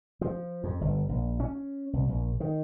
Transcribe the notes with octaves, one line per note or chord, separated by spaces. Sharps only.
F3
F2
G1
A#1
C#4
C2
A#1
D#3